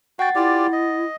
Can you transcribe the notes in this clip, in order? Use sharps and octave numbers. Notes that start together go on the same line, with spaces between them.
F#4 F#5 G5 A6
E4 F4 G4 D5
D#5